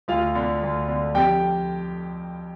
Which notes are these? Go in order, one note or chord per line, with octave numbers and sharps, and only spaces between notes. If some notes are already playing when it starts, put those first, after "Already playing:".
D2 F4 F5
D3
D2
D3
F2 G4 G5